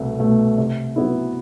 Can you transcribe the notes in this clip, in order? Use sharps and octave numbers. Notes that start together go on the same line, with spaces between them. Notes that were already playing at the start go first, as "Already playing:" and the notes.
Already playing: C2 B2 A3
B2 A3
C3
F#3 B3 E4